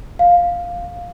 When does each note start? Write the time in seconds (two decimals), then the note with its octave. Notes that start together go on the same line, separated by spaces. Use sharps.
0.19 F5